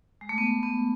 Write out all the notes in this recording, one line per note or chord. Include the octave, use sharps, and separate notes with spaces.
G#3
A3
B3
B3